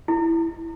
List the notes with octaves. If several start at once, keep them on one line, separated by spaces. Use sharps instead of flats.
E4